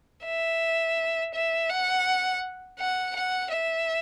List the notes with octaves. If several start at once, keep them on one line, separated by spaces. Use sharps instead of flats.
E5
E5
F#5
F#5
F#5
E5